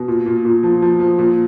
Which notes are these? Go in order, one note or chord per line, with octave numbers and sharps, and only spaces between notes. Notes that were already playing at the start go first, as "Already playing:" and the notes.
Already playing: B2
A#2
A#2
A#2
F3
F3
F3
A#2